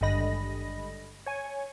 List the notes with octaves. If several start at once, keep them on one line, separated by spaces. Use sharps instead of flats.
G#1 G2 D3 D#5 B5 A#6
C#5 G#5